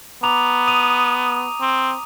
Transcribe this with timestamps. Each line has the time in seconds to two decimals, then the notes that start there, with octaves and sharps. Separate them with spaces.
0.23 B3 A#5 D6 F7
0.67 D#6 D#7 F7
1.61 C4